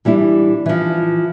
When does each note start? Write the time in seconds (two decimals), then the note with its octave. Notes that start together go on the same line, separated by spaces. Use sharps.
0.05 E3 G3 D4 E4
0.66 E3 F3